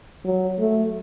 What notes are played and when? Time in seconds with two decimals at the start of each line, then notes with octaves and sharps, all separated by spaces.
0.25 F#3
0.59 A3